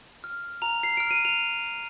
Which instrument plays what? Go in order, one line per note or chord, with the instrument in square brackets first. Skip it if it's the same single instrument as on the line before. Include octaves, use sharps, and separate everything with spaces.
[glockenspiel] F6
A#5 F7
C7
F6 D7
D#7
F7